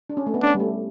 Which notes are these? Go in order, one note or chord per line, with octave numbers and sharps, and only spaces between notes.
D4
C#4
A3
B3
C#4 D4
G3
A3